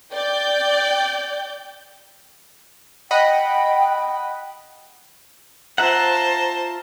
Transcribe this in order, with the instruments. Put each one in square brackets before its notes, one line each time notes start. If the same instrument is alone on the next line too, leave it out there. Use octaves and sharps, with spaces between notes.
[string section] D5 G5 G6
[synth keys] D#5 F#5 B5 [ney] G5
[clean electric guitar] F4 E5 F#5 [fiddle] C5 A5 [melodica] A#5